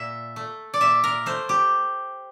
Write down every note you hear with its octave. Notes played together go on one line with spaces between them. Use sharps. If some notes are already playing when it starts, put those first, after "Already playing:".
Already playing: A#2 E5
A3
D5
A#2 E5
A#4
A3 C5
G4